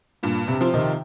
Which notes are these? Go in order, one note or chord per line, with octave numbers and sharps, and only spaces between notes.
G2 A#2
C3
F3 C4 F4
C3 D#3